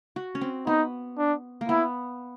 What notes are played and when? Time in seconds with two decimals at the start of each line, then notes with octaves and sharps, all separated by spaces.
0.16 F#4
0.35 C#4
0.41 C4
0.67 B3 D#4
1.18 D4
1.61 A#3
1.69 B3 E4